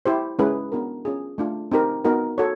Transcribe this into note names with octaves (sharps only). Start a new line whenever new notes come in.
E4 G4 C5
G#3 C#4 E4 G#4 B4
B3 D4 F#4 A#4
C#4 F4 G#4
A3 D4 F4
C4 D#4 G4 A#4
B3 D#4 F#4 A#4
F#4 A4 C#5